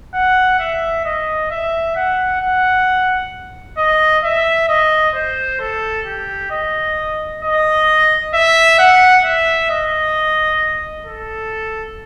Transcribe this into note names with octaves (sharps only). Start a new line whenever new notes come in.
F#5
E5
D#5
E5
F#5
F#5
D#5
E5
D#5
C5
A4
G4
D#5
D#5
E5
F#5
E5
D#5
A4